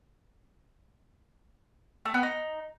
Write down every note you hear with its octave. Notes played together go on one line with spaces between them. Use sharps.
A3
B3
D#4